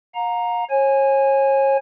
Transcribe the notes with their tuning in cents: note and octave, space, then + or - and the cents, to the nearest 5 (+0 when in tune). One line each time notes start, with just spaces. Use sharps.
F5 +40 A#5 +0
C#5 -35 G#5 +0